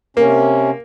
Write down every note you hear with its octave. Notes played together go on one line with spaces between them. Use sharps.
C3 A#3 C#4